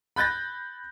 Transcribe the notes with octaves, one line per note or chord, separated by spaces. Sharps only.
B5 F#6 G6 A6 A#6